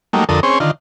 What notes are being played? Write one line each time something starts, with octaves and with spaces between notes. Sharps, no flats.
F#3 G3 A3 A#3 D#4
F2 D3 A4 A#4 D#6
C4 C#4 G#4 C5 C#5
D3 D#3 F4